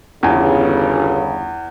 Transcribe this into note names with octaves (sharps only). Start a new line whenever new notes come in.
G1 E2 C#3 G#5